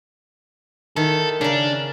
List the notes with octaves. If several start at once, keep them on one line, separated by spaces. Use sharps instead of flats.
D#3 E4 A4
C#3 D4 A#4